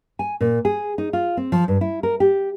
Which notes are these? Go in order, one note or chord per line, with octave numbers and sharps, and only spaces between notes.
G#5
A#2
G#4
D#4
F4
C4
F3
G2
E4
A#4
G4